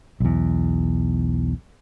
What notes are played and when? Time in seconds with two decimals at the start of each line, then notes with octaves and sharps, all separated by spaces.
0.20 B1 E2